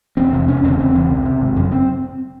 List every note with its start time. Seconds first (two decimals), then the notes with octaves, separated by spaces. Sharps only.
0.17 E1 C4
0.33 E2 C3
0.48 E1 C#4
0.63 E2 C#3 C4
0.79 E1 C4
0.95 E2 C#3
1.10 C#2
1.25 C3
1.41 G#1
1.56 F#2 C#3
1.72 C4